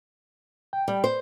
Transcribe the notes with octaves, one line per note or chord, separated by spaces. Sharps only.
G5
G3
C5